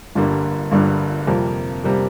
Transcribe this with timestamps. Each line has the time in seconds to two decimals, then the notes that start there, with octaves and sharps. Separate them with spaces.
0.15 G1 G2 D3 G3 A#3
0.71 G1 G2 D3 G3 A#3
1.27 F2 C3 G3 A#3
1.84 C3 G3 A#3